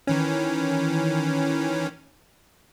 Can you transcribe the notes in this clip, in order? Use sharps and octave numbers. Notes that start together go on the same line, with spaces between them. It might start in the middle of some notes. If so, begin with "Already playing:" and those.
D#3 E3 C#4